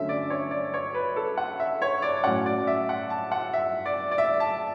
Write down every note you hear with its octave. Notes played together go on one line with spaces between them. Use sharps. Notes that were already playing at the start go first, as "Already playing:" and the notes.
Already playing: D3 F#3 A3 C#4 E5
D5
C#5
D5
C#5
B4
A4
F#5
E5
C#5
D5
A2 F#3 C#4 F#5
D5
E5
F#5
A5
F#5
E5
D5
D5
E5
A5